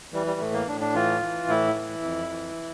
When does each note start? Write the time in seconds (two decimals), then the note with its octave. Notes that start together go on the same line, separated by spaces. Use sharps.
0.13 E3 G3
0.26 G3
0.40 A2 A3
0.53 A#3
0.67 A2 D4
0.81 D4
0.94 E3 F4
1.21 E3
1.48 A2 E4
1.75 E3
2.03 F2
2.30 E3